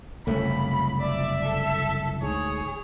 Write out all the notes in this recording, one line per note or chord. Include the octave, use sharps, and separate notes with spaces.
F#1 C2 F2 A3 B3 C#4 B5
D5 E5
A4
D2 G#2 G#4 C#5